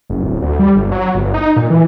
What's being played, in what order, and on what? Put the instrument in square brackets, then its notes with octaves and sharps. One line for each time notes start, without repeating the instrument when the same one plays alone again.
[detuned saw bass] F#1
D1
D2
G3
G1
F#3
G1
D#4
A#2
E3